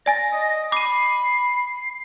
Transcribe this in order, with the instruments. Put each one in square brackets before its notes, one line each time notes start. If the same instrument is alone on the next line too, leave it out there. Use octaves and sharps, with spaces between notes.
[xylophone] D5 G#5 A6 [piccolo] A#6
[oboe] D#5
[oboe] B5 [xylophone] D6 D#7 [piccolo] C7